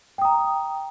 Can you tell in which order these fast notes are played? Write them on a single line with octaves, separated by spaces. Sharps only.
G5 D#6 A#5